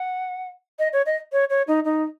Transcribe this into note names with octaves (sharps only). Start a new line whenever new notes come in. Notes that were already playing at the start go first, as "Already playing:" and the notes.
Already playing: F#5
D#5
C#5
D#5
C#5
C#5
D#4
D#4